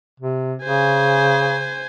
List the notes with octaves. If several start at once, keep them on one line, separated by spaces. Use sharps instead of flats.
C3
C#3 C5 G#5